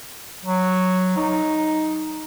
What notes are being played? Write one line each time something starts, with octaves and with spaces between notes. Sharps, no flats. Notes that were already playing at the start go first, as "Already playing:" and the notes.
F#3
D#4